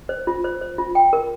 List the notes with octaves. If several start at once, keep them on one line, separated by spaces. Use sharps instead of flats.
C5
F4
C5
C5
F4
G5
A#4